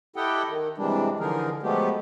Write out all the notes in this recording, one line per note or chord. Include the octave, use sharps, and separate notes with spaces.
E4 G4 A4 D#5 F#5 G5
D#3
C3 E3 G3 G#3 D4
D3 E3 F3 D#4 G#4 A#4
F3 F#3 G#3 A3 B3 G4